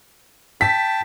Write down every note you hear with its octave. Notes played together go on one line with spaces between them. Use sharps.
G5 A5 B6